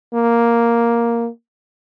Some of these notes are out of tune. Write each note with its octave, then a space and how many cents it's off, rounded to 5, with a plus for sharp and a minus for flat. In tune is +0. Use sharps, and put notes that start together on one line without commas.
A#3 +5